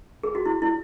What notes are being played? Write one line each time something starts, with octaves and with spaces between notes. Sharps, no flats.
G#4
F#4
E4
E4